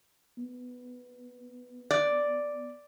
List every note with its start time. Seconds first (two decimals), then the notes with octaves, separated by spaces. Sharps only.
0.38 B3
1.91 D5